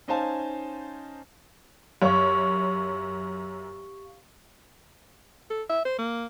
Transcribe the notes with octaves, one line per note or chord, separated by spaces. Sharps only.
C#4 D#4 C5 F5 G#5 A5
F#2 G4 C#5 F5 C#6
A4
E5
C5
A#3